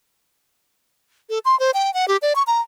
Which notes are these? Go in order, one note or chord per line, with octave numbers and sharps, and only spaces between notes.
A4
C6
C5
G5
F#5
G4
D5
C#6
A#5